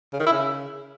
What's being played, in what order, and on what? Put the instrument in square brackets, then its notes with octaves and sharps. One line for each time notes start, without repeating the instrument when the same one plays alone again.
[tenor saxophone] C#3
D#3
E4
C#3